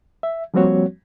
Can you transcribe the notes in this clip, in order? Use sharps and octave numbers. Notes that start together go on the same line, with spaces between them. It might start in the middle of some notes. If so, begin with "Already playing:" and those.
E5
F3 G3 A#3 C4 F#4 C#5